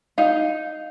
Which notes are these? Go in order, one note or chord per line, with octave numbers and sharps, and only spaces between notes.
D#4 F5